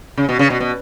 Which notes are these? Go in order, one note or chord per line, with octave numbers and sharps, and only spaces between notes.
C#3
B2
C#3
B2
B2